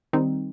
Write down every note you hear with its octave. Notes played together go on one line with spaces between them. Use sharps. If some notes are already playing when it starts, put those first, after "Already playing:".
D#3 G3 C4 D#4